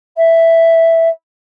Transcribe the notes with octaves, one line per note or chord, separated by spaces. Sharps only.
E5